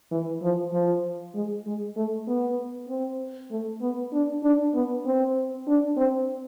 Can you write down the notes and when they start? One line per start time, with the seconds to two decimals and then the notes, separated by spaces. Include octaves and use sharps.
0.11 E3
0.42 F3
0.73 F3
1.35 G#3
1.66 G#3
1.96 A3
2.28 B3
2.89 C4
3.51 A3
3.81 B3
4.12 D4
4.43 D4
4.74 B3
5.05 C4
5.68 D4
5.97 C4